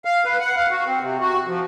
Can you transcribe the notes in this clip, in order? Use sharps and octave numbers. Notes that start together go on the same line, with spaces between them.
F5
B4
F#5
F5
F#4
C4
C3
F#4
F3